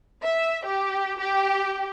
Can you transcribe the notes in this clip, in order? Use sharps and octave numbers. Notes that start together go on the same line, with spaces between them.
E5
G4
G4